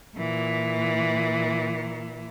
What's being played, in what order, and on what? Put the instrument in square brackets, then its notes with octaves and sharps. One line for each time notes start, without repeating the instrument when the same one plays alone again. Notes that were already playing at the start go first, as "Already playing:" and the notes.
[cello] A#2 E3